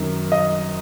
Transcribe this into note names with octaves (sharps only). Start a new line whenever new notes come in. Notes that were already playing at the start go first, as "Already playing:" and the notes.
Already playing: F#2 D#3
D#5